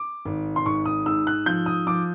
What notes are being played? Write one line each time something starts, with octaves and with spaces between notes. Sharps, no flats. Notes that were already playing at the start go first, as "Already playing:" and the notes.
Already playing: D6
G#1
C6
G#2 C#6
D#6
G#2 E6
F#6
F3 G6
D#6
F3 D6